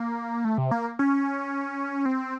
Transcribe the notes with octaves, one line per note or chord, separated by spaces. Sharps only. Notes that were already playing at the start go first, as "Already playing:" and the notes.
Already playing: A#3
A3
C3
A#3
C#4
C4